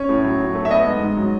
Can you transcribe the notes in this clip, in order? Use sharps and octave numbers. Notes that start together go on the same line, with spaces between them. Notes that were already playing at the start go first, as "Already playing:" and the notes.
Already playing: C#4 C#5
A2
F#3
F#3
A3
E5
B3 D#5
G#2
G#2
F#3